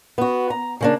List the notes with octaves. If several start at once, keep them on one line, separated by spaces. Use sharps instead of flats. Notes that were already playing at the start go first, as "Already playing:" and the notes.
B3 F#4
A#5
C#3 A#3 D4